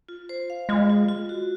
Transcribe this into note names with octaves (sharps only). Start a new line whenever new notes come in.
F4
C5
F5
G#3 F4
F4
F4
F#4